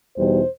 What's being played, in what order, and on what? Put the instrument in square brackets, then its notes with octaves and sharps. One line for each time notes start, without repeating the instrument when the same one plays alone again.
[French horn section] E2 B2 G3 D#4 C5